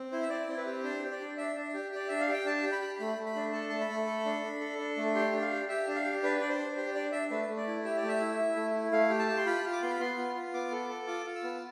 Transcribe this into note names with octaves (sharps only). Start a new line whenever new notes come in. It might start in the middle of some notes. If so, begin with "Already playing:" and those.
Already playing: C4
E4 C5
E5
C4 D5
C4
B4
G4
D4 C5
G4
D5
D4
D4 E5
D4
G4
G4 D5
D4 E5
F5
G4
G5
D4 A5
G4
B5
G4
A3 B5
A3
B5
D4
A4 A5
A3 A5
B5
A3
A4
D4
D4
A4
D4
A3
G4 C6
D4
F5
G4
G4 E5
D4
F5
G4
D4 B4
D4 D5
C5
D4
G4 C5
D4 D5
D4 E5
A3 B4
A3
D5
E4
G4 E5
D5
A3
E5
E4
E4
A3
E4
A3 F5
G4
A5
G4
C6
F4 B5
F4
D6
B3 C6
B5
B3 C6
F4
F4
B3 D6
A4
D6
A4
F4 D6
F4
E6
B3